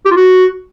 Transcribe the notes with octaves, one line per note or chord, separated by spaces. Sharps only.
G4
F4
F#4